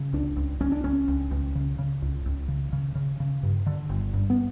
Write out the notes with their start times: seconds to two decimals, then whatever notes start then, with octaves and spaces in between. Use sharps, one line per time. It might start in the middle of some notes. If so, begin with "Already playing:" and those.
Already playing: C#3
0.13 C#2 D4
0.36 C#2
0.60 C#2 C#4
0.72 D4
0.84 C#2 C#4
1.08 C#2
1.31 C#2
1.55 C#3
1.79 C#3
2.02 C#2
2.26 C#2
2.48 C#3
2.73 C#3
2.95 C#3
3.20 C#3
3.43 G2
3.66 D3
3.90 G1
4.14 G2
4.30 B3